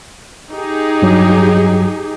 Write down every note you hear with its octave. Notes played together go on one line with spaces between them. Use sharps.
D#4 G4 G#4
G2 F#3